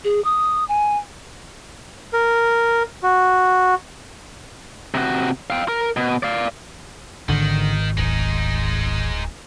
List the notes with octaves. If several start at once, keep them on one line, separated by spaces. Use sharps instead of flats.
G#4
D#6
G#5
A#4
F#4
C3 F#4
F5 G5
A#4
B2
D5 F5
G#1 D3 D#3
D1 G#3 D#4